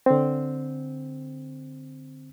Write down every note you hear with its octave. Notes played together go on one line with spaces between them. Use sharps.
D3 C4